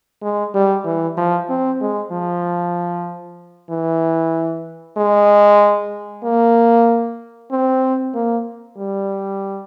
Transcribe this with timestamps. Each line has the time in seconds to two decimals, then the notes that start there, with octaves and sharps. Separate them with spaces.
0.22 G#3
0.54 G3
0.85 E3
1.17 F3
1.49 C4
1.81 G#3
2.12 F3
3.70 E3
4.97 G#3
6.24 A#3
7.51 C4
8.15 A#3
8.77 G3